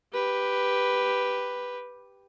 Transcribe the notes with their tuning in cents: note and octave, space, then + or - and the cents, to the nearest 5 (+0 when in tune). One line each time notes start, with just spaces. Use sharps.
G4 +0 B4 +0